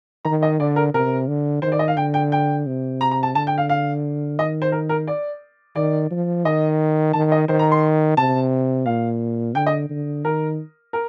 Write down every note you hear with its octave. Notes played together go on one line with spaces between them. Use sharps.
D#3 A#5
D#5
D3 D5
A#4
C3 A#4
D3
D#3 C5
D5
D#5
F5
D3 G5
G5
G5
C3
A#5
A#5
A5
D3 A5
G5
F5
F5
D#3 D#5
C5
A#4
A#4
D5
D#3 D5
F3
D#3 D#5
D#3 A5
D#5
D#3 C5
A#5
C6
C3 A5
A#2 F5
D3 G5
D#5
D3
D#3 A#4
A#4